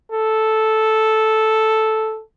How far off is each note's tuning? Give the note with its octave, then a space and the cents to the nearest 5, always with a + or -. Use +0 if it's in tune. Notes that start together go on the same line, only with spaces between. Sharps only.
A4 -5